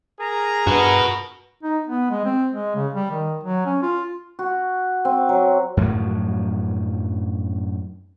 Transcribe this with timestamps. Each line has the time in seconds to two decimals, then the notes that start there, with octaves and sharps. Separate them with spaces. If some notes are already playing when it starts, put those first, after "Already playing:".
0.20 G#4 A#4 A#5
0.67 G2 F#4 B4
1.63 D#4
1.87 B3
2.10 G#3
2.25 C4
2.52 G#3
2.75 C#3
2.93 G3
3.11 D#3
3.43 F#3
3.66 C#4
3.82 F4
4.39 F#4
5.05 C4
5.29 F#3
5.77 F#2 A2 F3 F#3